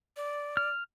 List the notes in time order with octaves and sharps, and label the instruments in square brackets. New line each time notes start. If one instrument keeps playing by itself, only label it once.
[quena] D5
[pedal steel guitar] F6